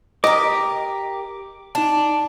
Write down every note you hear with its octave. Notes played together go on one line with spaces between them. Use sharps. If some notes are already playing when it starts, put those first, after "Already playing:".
G4 A#4 D#5 D6
D4 D#4 A5